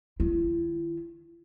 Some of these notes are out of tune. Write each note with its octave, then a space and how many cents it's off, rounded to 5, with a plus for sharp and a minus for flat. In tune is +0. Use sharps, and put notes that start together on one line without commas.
D#3 +0 E4 +40